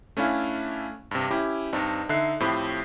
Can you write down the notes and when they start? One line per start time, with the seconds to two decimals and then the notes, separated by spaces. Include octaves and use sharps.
0.17 A3 C#4 D4 E4 F5 G#5
1.11 G2 C3
1.31 C#4 E4 G4
1.73 G2 C4 D4 D#4
2.09 D3 D#4 E5 F#6 C7
2.40 A2 F3 A3 C4 G4 B5